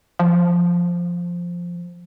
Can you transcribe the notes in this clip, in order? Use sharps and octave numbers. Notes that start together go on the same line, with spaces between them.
F3